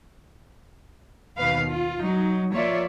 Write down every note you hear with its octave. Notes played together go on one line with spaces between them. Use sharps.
D#2 B2 D#3 B4 F5
F4
F#3 D#4
F3 A#3 F4 C#5 D5 E5